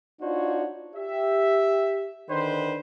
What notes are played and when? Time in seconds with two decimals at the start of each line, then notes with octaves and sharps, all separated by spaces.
0.21 D4 D#4 F4 F#4 C5 C#5
0.96 G4 E5
2.30 D3 D#3 D4 B4 C5